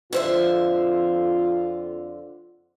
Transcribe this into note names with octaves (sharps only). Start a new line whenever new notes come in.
F2 D3 F4 C5 E5